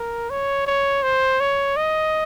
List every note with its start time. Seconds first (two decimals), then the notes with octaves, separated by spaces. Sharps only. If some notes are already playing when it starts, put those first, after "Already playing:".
Already playing: A#4
0.30 C#5
0.66 C#5
1.03 C5
1.40 C#5
1.77 D#5